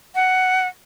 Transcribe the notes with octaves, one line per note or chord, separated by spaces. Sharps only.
F#5